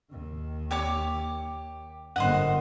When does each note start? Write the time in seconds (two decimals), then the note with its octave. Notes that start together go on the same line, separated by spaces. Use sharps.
0.11 D#2 D#3
0.71 G4 C#5 D6
2.16 G1 A#3 C5 D#5 F#5